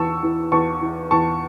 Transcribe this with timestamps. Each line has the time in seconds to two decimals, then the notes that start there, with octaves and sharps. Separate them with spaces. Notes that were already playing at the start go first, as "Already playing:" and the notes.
Already playing: E2 E3 A5 C#6 E6
0.23 E3
0.52 E2 A5 C#6
0.81 E3
1.11 E2 A5 C#6